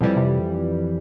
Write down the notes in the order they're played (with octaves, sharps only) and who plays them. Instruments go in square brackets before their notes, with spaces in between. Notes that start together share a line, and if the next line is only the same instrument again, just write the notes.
[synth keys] F2 E3 G3 [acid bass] B2
[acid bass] C3